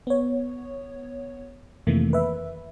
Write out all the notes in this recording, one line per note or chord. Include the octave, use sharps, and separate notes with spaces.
B3 C#5
F2 C3 D#3 E3 A3 A#3
B4 E5